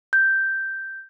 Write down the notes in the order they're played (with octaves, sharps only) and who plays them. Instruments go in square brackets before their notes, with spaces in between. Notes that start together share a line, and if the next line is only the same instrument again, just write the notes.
[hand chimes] G6